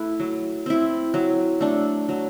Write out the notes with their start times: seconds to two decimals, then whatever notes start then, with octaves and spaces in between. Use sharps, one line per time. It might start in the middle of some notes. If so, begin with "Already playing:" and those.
Already playing: A3 E4 B4
0.20 F#3
0.66 C4 E4
1.14 F#3
1.61 A3 D4 A4
2.09 F#3